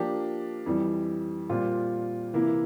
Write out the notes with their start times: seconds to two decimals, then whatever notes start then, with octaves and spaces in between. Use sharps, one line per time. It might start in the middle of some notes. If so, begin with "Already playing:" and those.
Already playing: F3 A#3 D4 G4
0.66 F2 E3 G3
1.49 A#2 G3 C4 F4
2.33 C3 E3 A#3 E4